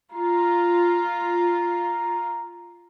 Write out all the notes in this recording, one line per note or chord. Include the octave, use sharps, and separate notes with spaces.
F4 A#5